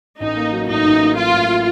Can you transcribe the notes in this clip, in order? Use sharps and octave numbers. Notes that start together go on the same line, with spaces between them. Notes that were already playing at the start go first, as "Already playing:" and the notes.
A1 D#4
A#3
F#3
A2 D#4
A1
A#3
F#3 F4
A2